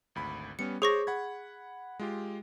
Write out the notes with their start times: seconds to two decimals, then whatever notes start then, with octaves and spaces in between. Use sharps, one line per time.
0.15 G#1 D2 B5
0.59 G3 B3 C#4 C#7
0.82 G#4 C5 C#5 C#6 D6 A#6
1.07 F#5 B5 G#6
1.99 G#3 F4 G4